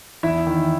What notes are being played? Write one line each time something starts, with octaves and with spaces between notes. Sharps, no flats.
E2 E4 E5
D#3